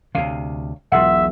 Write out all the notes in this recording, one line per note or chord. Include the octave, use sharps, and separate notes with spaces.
D2 C3 C#5 F5
E1 B1 F4 G#4 E5 F#5